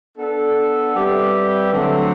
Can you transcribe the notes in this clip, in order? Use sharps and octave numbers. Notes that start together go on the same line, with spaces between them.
B3 D4 A4
G3 C4 G4 B4 E5
D3 F#3 A3 C4